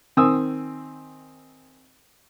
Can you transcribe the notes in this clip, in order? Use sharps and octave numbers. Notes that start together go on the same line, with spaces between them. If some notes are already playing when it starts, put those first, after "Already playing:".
D#3 C4 G#5 D#6 E6